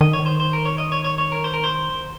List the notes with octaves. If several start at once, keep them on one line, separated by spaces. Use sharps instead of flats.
D#3 D#5
C#5
C5
C5
A#4
C#5
D#5
C#5
C#5
C#5
A#4
C5
A#4
C5